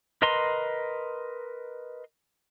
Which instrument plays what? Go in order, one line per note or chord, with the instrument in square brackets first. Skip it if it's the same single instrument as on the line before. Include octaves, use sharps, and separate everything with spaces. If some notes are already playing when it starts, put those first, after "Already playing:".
[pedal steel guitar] A#4 B4 D#5 A#5 C6